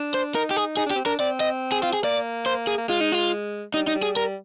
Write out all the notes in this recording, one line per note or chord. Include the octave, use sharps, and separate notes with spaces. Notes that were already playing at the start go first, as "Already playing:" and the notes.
Already playing: D4
C5
D#4 A#4
G4
G#4
D#4 G#4
D4
G4
C4
D4 A#4
C4 D5
D#5
G#4
F4
G#4
A#3 D5
C5
G#4
A#3
G#3 F4
D#4
F4
G3 D#4
D#4
G3
G#4
G3 A#4